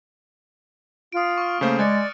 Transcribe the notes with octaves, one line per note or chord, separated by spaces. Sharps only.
F4 D#6 D7
C#6 F6
C#3 A3 A#3 C5
G#3 D5 G#5 F#6 A6 C#7